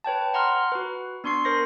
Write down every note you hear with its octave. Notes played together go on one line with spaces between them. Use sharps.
B4 C#5 G5 A5
F#5 A#5 C6 F6
F#4 B4
B3 D4 C6 C#6 C7
A#4 C5 A#6